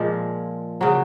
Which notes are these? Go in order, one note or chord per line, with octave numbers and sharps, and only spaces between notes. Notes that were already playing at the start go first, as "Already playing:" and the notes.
Already playing: A#2 F3 G#3 G#4
C#3 F#3